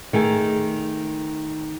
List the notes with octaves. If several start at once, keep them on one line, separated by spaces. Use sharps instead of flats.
D#3 A3 G#4